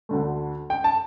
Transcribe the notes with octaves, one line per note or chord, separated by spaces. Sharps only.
D2 D3 A3
G5
A5